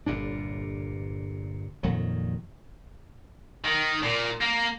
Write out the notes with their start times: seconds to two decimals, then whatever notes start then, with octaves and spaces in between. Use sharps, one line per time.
0.06 G1 A#2 D4
1.83 F2 A#2 D#3 F#3
3.65 D#3
4.03 A#2
4.41 A#3